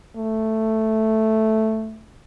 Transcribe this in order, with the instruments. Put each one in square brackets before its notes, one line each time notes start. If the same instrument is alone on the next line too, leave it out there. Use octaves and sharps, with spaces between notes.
[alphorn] A3